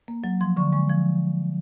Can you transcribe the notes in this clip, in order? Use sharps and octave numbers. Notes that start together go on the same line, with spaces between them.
A#3
F#3
F3 C6
D3 C#6
G#3 C#6
F3